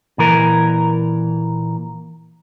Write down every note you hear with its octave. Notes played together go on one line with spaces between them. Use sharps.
A#2 E3 A#4